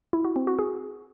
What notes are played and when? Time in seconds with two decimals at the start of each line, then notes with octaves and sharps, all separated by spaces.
0.13 E4
0.25 F#4
0.36 C4
0.47 F#4
0.59 G#4